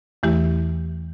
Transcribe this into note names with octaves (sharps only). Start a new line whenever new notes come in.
E2 E3 A3 E4 G4